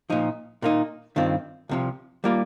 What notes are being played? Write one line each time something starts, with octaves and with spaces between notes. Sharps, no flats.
A#2 F3 D#4
A#2 A#3 D#4
G2 D#3 C4 F4
C2 C3 F3
G3 A#3 F4